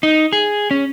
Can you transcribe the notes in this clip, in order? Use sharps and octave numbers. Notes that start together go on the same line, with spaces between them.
D#4
G#4
C#4